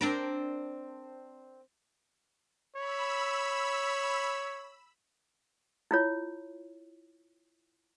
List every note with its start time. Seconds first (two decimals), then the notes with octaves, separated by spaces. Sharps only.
0.01 C4 D4 A#4
2.76 C#5 B5 E6
5.91 E4 F4 C#5